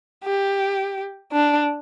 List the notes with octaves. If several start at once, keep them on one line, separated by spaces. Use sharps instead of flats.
G4
D4